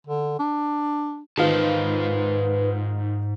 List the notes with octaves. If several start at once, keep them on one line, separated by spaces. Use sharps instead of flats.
D3
D4
G#2 D#3 F4 B4 C5 A5